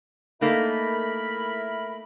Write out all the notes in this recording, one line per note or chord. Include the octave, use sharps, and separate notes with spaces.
A3 A#3 D#4 E4 A#4 B5